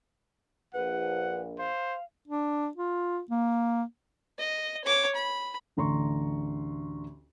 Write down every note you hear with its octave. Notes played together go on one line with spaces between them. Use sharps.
A#1 B4 F#5
C5 F5
D4
F4
A#3
D#5
C#5 D6
B5
A1 D2 A#5 C6 C#6